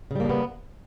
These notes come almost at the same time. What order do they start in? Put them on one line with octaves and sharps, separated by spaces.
C#3 G3 A#3 D4 B3